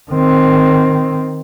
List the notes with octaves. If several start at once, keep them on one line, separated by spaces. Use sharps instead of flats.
D#3 C4